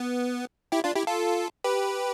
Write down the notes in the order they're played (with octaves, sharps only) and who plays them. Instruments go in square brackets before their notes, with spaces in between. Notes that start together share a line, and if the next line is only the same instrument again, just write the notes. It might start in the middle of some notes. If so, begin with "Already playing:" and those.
Already playing: [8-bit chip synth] B3
E4 G4
D4 F4
E4 G4
F4 A4
G4 B4